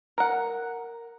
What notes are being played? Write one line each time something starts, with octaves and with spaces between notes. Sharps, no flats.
A#4 F#5